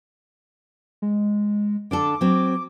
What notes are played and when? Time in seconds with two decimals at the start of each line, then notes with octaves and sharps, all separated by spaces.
1.02 G#3
1.91 D3 D4 A4 D6
2.21 F#3 C4